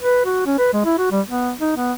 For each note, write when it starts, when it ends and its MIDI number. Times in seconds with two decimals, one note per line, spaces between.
0.01 0.23 71
0.25 0.44 66
0.46 0.55 61
0.58 0.70 71
0.73 0.81 56
0.85 0.95 64
0.98 1.07 66
1.11 1.21 55
1.27 1.52 59
1.60 1.72 63
1.77 1.93 59